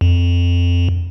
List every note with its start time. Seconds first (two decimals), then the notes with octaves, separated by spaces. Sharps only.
0.01 F2